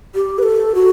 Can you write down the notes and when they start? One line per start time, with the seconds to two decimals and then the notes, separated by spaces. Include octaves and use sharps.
0.15 G4
0.38 B4
0.43 A4
0.75 F#4